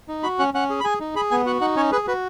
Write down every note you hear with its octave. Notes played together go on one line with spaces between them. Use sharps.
D#4
F#4 B5
C#4 F#5
C#4 F#5
G#4
B5
G#4 G#5
D#4
G#4 B5
B3 G#5
F#4 F#5
D#4 F#5
C#4 C#5
G#4 B4
F#4 B4